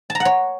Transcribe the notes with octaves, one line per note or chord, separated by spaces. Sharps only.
A5
A#5
F#5
C#5